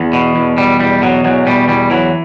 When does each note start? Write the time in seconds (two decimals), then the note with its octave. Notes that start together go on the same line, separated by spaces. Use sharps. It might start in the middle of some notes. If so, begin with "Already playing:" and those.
Already playing: E2 B3
0.13 B2
0.36 E2
0.57 B2 G3
0.79 E2 G3
1.02 B2 F#3
1.25 E2 F#3
1.47 B2 G3
1.68 E2 G3
1.91 E3 F#3